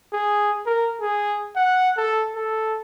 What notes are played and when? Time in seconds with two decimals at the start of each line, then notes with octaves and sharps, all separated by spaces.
0.13 G#4
0.66 A#4
1.01 G#4
1.56 F#5
1.97 A4
2.36 A4